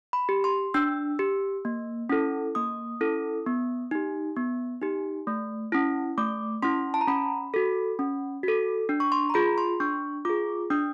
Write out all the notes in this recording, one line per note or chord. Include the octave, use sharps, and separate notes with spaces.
B5
G4
C6
D4 E6
G4
A#3
C#4 E4 A4
A#3 D#6
C#4 E4 A4
B3
D#4 G4
B3
D#4 G4
A3
C#4 E4
A3 D6
C#4 E4 C6
A5
A#5
C#4 B5
F#4 A4
C#4
F#4 A4
D4
C#6
C6
A#5
F4 G#4 B5
C6
D4 C#6
F4 G#4 D6
D4 D#6